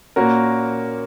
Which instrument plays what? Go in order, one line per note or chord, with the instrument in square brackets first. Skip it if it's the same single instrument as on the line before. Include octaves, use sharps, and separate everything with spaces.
[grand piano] A#2 A#3 C#4 F#4 A#4